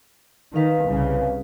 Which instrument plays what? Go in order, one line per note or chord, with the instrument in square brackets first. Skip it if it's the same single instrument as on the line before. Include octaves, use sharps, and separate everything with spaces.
[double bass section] D#3 [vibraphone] B4 F5
[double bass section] C2 C#3